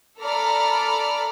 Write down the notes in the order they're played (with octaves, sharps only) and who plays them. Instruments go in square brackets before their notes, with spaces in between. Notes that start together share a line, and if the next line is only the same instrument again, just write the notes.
[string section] A4 D5 A#5 B5 F6